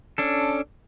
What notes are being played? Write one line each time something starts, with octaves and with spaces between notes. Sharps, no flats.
C#4 D4 A4